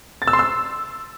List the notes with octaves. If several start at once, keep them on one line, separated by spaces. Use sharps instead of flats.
A6
E6
C6
E6